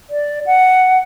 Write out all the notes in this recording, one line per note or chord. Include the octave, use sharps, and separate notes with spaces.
D5
F#5